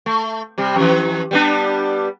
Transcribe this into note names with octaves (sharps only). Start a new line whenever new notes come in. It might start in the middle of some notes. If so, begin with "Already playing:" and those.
A3
C3 G3
F2 E3
G3 B3 D4